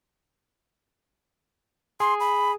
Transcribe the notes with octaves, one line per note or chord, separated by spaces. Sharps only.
G#4 C6
B5